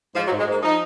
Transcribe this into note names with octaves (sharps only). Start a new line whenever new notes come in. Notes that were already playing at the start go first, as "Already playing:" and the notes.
G#2 F3
F#3
G#2
G#3
G#2 A#3
F3 D#4